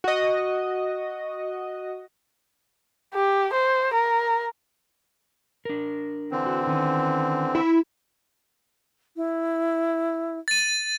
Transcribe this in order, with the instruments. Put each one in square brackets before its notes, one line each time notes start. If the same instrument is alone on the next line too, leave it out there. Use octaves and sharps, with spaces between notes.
[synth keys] F#4 D#5
[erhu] G4
C5
A#4
[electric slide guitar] D4 A#4
[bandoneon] D3 E3 C4
[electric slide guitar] F#4
D#3 C#4
[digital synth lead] E4
[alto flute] E4
[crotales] A6 D#7